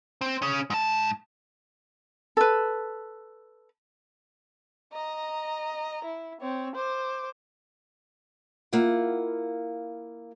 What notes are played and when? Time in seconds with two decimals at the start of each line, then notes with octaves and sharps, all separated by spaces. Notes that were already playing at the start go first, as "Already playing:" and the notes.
0.21 C4
0.42 C#3 C#4
0.70 G#2 A5
2.37 A4 B4
4.93 D#5 A#5
6.04 E4
6.41 C4 C#5
6.75 C5 D6
8.73 A#3 E4 F4 F#5